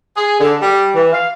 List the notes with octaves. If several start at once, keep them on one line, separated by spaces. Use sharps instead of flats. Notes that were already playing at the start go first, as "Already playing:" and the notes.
G#4
D3
G3
E3
F5